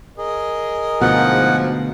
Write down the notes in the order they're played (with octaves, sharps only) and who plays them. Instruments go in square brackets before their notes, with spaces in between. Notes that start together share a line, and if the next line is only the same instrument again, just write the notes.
[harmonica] G#4 A#4 D#5
[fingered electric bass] D2 B2 [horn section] G#2 F3 [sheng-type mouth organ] F#5